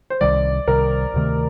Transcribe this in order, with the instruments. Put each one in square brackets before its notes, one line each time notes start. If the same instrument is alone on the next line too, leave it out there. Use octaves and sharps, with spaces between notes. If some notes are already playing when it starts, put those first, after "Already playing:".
[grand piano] C5
[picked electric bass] C2 C3 D#3 G3 [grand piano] D5
[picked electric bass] C2 C3 D#3 G3 [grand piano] A#4
[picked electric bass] D2 C3 D#3 A3